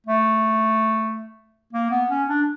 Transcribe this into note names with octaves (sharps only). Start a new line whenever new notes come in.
A3
A#3
B3
C#4
D4